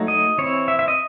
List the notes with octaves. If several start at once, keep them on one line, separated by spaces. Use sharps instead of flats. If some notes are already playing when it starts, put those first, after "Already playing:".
Already playing: F#3 A3 D#4
D#5
E3 C4 E4 C#5
E5
E5
D#5